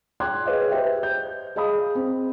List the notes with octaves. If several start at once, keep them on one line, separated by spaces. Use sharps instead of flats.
G5 C6 D6 F#6 G#6
G#4 B4 C#5 D#5 F5
G4 B4 C5 D#5 E5 G5
G6
G#4 D#5 F5 B5 D#6
C4